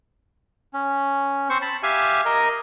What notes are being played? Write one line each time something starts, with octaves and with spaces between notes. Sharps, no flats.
C#4
C4 C5 C#6
A5 B5
G4 E5 F5 G#5
A#4 D#5